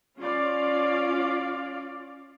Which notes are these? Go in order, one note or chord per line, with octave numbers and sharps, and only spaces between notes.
C#4 F4 D5 F5